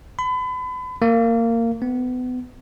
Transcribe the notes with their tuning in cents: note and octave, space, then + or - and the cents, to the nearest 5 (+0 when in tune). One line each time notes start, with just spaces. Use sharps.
B5 +35
A#3 -20
B3 +30